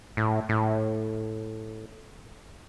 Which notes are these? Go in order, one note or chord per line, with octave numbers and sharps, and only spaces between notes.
A2
A2